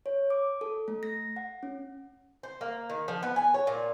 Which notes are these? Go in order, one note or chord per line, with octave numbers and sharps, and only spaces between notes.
C#5
D6
A4
A3
A#6
F#5
C#4
C5
A#3
D#3
F3
B3
G#5
C#5
A#2